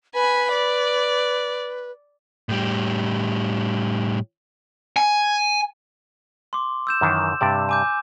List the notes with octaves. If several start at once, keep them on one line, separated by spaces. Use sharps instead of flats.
B4 G#5 B5
D5
A2 G3
G#5
C6 D6
E6 G6 E7
F#2 D#3 E3
G2 C3 D5
G#5 D6 G6